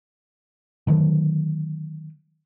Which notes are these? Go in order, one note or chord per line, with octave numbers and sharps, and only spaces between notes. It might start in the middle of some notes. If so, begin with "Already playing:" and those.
D3 D#3 F#3 A3